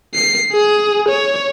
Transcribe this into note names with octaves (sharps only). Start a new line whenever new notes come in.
C7
G#4
C#5